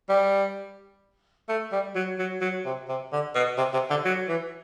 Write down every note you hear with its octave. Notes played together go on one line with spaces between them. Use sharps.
G3
A3
G3
F#3
F#3
F#3
C3
C3
D3
B2
C3
C3
D3
F#3
E3